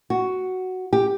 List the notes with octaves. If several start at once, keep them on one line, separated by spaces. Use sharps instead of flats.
F#4
G4